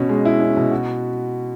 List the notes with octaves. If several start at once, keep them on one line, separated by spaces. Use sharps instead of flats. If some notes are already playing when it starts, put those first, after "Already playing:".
Already playing: B2 C#4
G#3
E4
C#4
B2
F#4